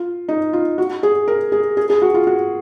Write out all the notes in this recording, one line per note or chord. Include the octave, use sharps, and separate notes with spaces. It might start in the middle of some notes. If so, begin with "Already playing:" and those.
Already playing: F4
D#4
F4
F#4
G#4
A#4
G#4
G#4
G#4
F#4
F4
F#4